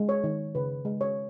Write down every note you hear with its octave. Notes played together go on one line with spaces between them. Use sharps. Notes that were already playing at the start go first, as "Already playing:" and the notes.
Already playing: G#3
C#5
D#3
C#3 B4
G#3
C#5